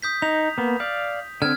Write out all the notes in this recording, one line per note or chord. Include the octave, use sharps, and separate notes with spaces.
D#6 G6 B6
D#4 F7
A#3 B3
D5 F5 G6
D3 C4 F6 G#6